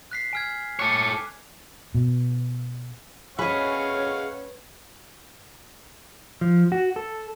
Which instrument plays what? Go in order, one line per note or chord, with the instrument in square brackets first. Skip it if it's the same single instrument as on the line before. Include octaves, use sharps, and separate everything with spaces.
[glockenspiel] F#6 B6 C7
G#5 F6 G#6
[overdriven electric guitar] A4 C#5 [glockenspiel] D6 F#6
[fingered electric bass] B2
[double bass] C#4 [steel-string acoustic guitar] G#4 D#5 [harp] B4 [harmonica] C#5 F5 F#5
[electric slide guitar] F3
F#4
A4